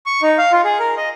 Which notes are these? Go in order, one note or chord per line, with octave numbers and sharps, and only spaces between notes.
C#6
D#4
F5
F4
G#4
A#4
D#5